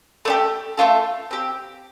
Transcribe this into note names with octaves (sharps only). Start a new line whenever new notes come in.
A3 D4 G4
A3 D4 F4 A4
C4 G4